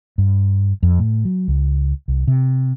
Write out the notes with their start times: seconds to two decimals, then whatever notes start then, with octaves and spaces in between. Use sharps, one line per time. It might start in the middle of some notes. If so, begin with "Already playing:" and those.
0.18 G2
0.83 F2
0.99 A2
1.25 F#3
1.48 C#2
2.08 C2
2.27 C3